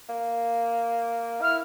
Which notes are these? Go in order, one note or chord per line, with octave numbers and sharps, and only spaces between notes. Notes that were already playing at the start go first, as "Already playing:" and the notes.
A#3
E4 F6